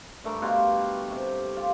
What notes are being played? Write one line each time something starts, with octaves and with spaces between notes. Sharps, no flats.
G2 A3 A#4 C#6
B2 G4 F5 C6
C3
F4 G4